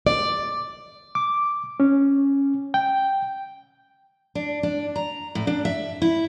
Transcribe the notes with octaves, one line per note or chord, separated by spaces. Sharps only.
D5
D6
C#4
G5
D4
D4
A#5
A2
D4
E5
E4